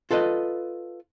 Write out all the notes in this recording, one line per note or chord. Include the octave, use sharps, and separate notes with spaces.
F4 A4 B4 D#5